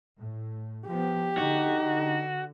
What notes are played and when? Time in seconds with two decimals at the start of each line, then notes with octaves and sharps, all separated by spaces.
0.19 A2
0.87 F3 B3 G4
1.38 D3 D#4 F#4